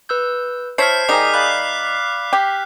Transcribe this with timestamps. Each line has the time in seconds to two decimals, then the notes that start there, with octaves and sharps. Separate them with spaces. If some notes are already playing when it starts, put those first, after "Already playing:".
0.09 B4 E6 G6
0.78 E4 C5 C#5 A5 F6 G6 B6 C7
1.09 D#3 G3 D#4 G#4 G#5 D6
1.34 D5 F5 B5 F#6
2.33 G4